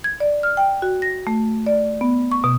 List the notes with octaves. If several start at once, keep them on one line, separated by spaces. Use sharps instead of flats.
G#6
D5
F6
G5
F#4
A#6
A3
D5
B3
C#6
B2